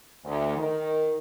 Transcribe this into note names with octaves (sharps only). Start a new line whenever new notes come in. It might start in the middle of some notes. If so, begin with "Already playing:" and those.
D2
D#3